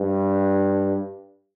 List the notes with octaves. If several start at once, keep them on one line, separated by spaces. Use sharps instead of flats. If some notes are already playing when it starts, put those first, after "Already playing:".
Already playing: G2